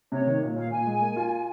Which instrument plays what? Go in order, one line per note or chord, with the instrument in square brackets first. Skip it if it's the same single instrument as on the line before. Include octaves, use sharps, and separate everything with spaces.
[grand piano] C3 [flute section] C#5
[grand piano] D#3
A#2
[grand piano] A#2 [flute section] F5
[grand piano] A#2 [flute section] G#5
[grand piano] G#3
A#3
F4